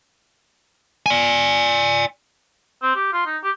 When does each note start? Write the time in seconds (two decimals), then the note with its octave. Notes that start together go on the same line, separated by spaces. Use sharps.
1.06 D5 G#5
2.82 C4
2.95 G4
3.13 F4
3.26 D#4
3.43 G4